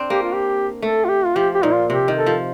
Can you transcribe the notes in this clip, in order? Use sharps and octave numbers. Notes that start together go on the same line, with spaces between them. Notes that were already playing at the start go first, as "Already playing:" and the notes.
Already playing: C4 D4
A#3 G4
F4
G4
A3 A4
F4
G4
F4
F3 G4
G4
A#2 D#4
F4
C3 G4
D#3
A4
F3